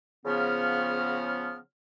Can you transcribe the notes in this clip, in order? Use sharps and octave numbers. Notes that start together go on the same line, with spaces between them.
C#3 F3 B3 F6